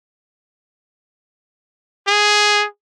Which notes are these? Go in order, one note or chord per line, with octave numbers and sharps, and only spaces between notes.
G#4